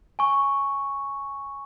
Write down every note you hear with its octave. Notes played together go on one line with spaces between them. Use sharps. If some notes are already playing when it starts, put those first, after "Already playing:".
G#5 C#6